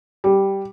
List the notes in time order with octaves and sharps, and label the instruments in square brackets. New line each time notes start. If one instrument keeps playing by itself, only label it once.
[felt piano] G3